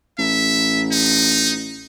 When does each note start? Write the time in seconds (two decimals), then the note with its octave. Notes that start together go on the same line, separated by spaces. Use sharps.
0.19 A1 E5
0.92 D#4